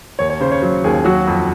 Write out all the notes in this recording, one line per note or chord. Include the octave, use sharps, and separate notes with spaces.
D#2 C#5
C#5
C#3 C5
C#5
F#3 C5
D#2 G#4
F#3 F#4
F2